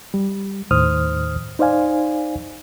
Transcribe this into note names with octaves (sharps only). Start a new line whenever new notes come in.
G3
D#2 A2 D#3 C5 D#6 F6
D#4 C5 D5 F5 G#5